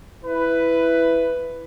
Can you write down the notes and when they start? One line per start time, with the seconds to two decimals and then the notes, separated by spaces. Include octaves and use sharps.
0.24 E4 B4